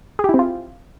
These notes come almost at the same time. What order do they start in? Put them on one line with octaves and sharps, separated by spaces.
G#4 G4 E4 C4 F4